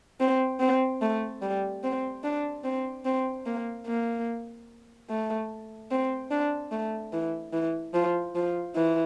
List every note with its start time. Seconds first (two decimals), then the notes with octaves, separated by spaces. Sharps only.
0.20 C4
0.60 C4
1.02 A3
1.42 G3
1.84 C4
2.24 D4
2.64 C4
3.05 C4
3.46 A#3
3.87 A#3
5.09 A3
5.91 C4
6.31 D4
6.72 A3
7.13 E3
7.53 E3
7.94 F3
8.35 F3
8.76 E3